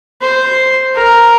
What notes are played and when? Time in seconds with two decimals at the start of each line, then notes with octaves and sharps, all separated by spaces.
0.21 C5
0.95 A#4